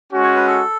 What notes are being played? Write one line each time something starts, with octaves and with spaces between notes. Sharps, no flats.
G#3 C#4 F#4
C#5
B4
A4